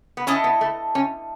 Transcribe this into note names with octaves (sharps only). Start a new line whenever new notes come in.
B3
C#4 E4 A4 D#5
B3
A3
C#4